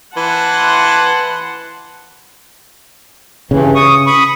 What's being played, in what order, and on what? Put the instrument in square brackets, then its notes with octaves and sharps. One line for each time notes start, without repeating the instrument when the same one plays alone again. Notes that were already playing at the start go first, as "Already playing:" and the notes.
[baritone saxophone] E3 [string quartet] F#5 A5 C6
[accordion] G2 E3 [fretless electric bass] C#3
[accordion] C#6 D#6
B5 C#6 D#6